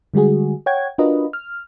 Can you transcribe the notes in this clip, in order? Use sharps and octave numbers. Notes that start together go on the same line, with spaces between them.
D3 G3 G#3 F#4 G#4
C#5 F#5 G5 G#6
D4 F4 F#4 A#4 B4 D#5
F6